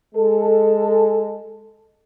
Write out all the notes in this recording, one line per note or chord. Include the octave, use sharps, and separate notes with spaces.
G#3 A4